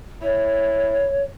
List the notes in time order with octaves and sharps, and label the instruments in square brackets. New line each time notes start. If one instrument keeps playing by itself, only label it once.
[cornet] E4 [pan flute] C#5